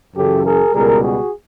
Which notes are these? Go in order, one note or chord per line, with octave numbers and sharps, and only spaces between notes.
F#2 C#3 E3 G4 A4
G#4 A#4
C#2 B2 G3 G#4 A#4
F#4 G#4